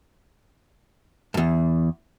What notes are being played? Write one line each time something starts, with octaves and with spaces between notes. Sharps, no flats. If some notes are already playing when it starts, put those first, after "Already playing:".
E2 G2